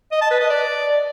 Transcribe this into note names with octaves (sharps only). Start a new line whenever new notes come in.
D#5
A5
B4
D#5
D5